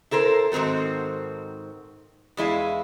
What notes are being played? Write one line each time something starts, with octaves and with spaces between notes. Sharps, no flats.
E4 A4 A#4 C5
G#2 D#3 C4 F#4 A4
E2 G#3 E4 F5